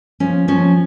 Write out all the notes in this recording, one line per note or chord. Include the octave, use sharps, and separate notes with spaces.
F3 C#4
F3 C#4